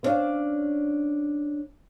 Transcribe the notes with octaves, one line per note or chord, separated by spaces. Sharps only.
B3 C#4 D4 C5 D5 F5